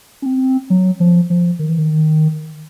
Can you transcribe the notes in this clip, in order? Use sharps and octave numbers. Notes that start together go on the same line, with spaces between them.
C#4
C4
F#3
F3
F3
D#3
E3
D#3